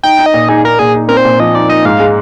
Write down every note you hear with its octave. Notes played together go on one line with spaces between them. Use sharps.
D#4 G5
D#4
D#5
A#2
D#4 G#4
D#4 A#4
A#2 G#4
D#4
C4 A#4
C5
A#2
F3 D#5
D#4 D5
D#4 D#5
G#2 F5
G#3